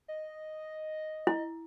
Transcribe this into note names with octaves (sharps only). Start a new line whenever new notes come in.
D#5
E4